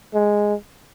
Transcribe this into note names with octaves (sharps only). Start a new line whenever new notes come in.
G#3